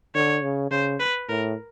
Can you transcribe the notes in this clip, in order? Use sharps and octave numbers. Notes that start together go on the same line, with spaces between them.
D3 C#5
C#3
C#3 C5
B4
A2 A#4